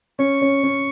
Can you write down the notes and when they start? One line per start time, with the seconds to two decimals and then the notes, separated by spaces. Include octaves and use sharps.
0.19 C#4 C#6
0.42 C#4
0.63 C#4